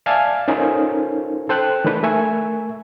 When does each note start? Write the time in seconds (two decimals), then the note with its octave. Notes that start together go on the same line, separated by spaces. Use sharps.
0.06 D5 E5 F5 G#5 A5
0.48 C#4 D#4 F4 A4 A#4 C5
1.49 A4 C5 G5 F#6
1.85 D#3 E3 A3 D4 B4
2.03 A3 A#4 E5 G#5 C#6